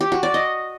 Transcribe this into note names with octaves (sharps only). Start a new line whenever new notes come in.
G4
F#4
D5
D#5